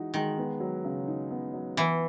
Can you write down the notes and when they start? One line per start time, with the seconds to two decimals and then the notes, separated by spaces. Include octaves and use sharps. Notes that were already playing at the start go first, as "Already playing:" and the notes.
Already playing: E3 G#3 D#4 F#4
0.14 D#3 G#3
0.38 B3
0.60 F#3
0.84 C#3
1.08 D#4
1.31 B3
1.54 F#3
1.77 E3 B3